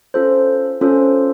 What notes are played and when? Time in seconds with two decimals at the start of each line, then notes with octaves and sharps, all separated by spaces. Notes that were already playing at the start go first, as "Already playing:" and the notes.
0.14 C#4 F4 A4 C5
0.81 C#4 F4 A4 C5